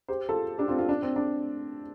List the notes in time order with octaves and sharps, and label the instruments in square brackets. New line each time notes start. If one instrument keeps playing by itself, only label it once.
[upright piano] G4 C5
F4 A4
D4 G4
C4 F4
C4 F4
D4
C4
D4